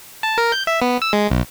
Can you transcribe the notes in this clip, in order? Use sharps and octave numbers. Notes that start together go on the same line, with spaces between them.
A5
A#4
G6
E5
B3
E6
G#3
B1